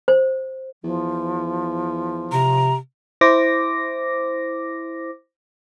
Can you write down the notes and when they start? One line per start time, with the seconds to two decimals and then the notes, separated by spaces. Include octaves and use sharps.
0.08 C5
0.84 E2 F3
2.32 C3 A#5
3.21 E4 C5 D6 A#6